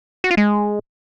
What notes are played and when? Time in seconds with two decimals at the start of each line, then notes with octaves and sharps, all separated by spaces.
0.24 F#4
0.31 F4
0.37 G#3